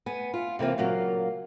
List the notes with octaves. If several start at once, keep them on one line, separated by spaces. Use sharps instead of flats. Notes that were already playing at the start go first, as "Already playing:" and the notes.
B3 G#5
F4
C3 E3 A#3 C4 F4
A#2 C#3 F#3 A#3 F5